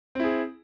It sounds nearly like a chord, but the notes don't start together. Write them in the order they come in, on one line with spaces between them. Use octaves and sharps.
C4 E4 G#4